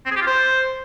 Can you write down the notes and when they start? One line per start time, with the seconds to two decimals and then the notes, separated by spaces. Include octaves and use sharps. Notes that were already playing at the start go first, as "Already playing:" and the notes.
0.05 C4
0.11 G#4
0.16 G4
0.21 F4
0.27 C5